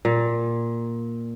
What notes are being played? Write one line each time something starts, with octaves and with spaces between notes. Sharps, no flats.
A#2